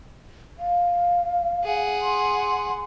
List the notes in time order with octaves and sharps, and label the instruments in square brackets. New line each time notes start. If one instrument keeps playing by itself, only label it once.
[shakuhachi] F5
[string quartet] G#4 F#5
[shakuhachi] C6